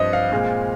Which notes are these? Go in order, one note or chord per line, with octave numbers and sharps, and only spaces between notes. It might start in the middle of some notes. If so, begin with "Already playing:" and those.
Already playing: G2 F3 C4 D#5
F5
A#2 G#3 C4